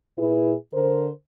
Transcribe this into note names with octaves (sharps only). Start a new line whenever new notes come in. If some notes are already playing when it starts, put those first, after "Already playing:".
A#2 E4 G#4 B4
D3 A#4 C5